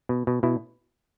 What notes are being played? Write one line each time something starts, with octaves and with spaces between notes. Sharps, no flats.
B2
B2
B2 E4